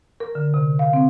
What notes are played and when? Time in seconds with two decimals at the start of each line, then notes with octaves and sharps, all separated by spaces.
0.20 A#4
0.35 D3
0.54 C3
0.79 F5
0.93 C4